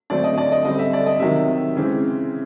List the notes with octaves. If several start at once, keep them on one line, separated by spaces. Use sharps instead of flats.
D3 F#3 A3 C4 D5
D#5
D5
D#5
D3 G3 C4 D#5
E5
D5
D#5
C3 D#3 F#3 E5
C#3 E3 G#3 C4